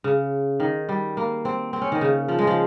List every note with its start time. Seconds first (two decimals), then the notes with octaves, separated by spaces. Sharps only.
0.04 C#3
0.60 D#3
0.89 G3
1.17 A#3
1.45 C4
1.73 C4
1.81 C#4
1.92 D#3
2.01 C#3
2.28 F3
2.39 G#3
2.47 F3